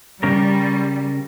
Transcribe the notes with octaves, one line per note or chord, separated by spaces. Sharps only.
C#3 G3 C#4 A#4